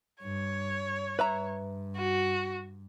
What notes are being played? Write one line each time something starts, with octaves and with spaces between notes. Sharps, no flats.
G2 C#5
G2 B4 E5 A#5
F#4